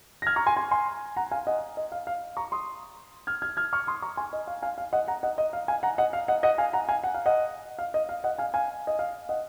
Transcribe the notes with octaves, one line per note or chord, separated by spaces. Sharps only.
A#6
F6 G#6
A#5 C#6
G#5 C6
G#5 C6
G#5 C6
F#5 A#5
F5 G#5
D#5 F#5
D#5
F5
F5
A#5 C#6
C6 D#6
F6 G#6
F6 G#6
F6 G#6
C#6 F6
C6 D#6
A#5 C#6
G#5 C6
D#5
F5
F5 G#5
F5
D#5 F#5
F#5 A#5
D#5 F#5
D#5
F5
F5 G#5
F#5 A#5
D#5 F#5
F5
D#5 F#5
D#5 F#5
F5 G#5
F#5 A#5
F5 G#5
F#5
F5
D#5 F#5
F5
D#5
F5
D#5 F#5
F5 G#5
F5 G#5
D#5
F5
D#5 F#5